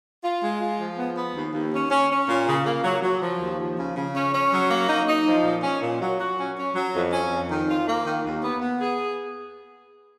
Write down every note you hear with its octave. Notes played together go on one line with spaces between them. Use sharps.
F4
G#3
F4
F3
B3
B3
D#2
D#2
C#4
C#4
C#4
A#2
C#3
A#3
F#3
F#3
F3
D#2
F3
C#3
C#3
C#4
C#4
F#3
A#3
D#4
D#4
F3
A#2
C#4
A#2
F#3
F#4
C#4
C#4
F#3
F2
C#4
F2
D#3
F4
A#3
D#3
D#2
B3
B3
G#4